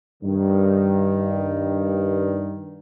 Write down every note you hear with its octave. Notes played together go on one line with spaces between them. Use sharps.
G2 D#3